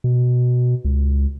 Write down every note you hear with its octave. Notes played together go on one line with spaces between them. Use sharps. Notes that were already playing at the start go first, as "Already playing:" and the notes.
B2
C#2